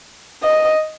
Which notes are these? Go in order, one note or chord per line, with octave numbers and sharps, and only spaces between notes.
D#5